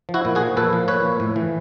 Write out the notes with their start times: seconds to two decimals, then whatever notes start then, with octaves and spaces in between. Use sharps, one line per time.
0.09 F3
0.14 E4 F#4
0.25 A#2
0.35 F#4 G#4
0.41 F3
0.57 A#2 A4 B4
0.73 F3
0.88 A#2 B4 C#5
1.05 F3
1.20 A2
1.36 E3